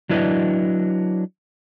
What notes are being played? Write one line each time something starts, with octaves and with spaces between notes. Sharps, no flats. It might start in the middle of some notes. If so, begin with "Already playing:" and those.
F#3 D4 E4 B4 D#5